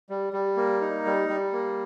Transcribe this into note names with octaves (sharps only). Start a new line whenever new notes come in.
G3
G3
A#3
D#4
G3
G3
A#3